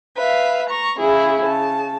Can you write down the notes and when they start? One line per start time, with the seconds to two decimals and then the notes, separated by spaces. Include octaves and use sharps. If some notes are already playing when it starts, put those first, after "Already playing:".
0.16 B4 E5 F5
0.69 A#5 C#6
0.98 C#3 E4 G#4
1.43 C#3 A5